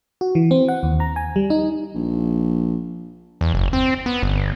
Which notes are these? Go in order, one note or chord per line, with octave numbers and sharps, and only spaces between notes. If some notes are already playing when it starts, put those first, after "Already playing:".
F#4
E3
C4
F#5
D#2
A#5
G#5
G3
D#4
A#1
E2
F#1
C4
B3
G1